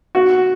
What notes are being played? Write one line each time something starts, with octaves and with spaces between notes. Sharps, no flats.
F#4